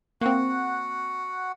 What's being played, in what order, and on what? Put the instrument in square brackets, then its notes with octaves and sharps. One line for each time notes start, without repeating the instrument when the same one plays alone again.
[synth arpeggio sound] A#3 C4 [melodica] F#4 F#5